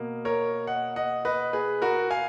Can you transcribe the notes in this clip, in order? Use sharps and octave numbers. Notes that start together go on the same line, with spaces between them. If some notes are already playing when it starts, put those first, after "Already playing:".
Already playing: B2 A#3
A#4 C#5
D#5 F#5
D#5 F#5
B4 D#5
G#4 B4
F#4 A#4
F5 G#5